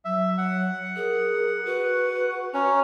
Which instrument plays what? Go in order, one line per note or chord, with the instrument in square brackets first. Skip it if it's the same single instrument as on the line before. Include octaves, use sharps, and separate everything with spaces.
[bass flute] F#3 [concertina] E5
[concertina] F#5
[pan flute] G#4 [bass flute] A#4
[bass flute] F#4 [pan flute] B4
[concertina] C#4 [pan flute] A#5